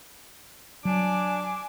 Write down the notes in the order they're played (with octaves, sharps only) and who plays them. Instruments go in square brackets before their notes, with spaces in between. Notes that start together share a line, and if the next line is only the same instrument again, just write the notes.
[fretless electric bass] F#3 [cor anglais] D4 [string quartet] G#5 D6